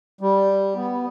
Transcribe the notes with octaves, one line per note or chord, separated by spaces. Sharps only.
G3
B3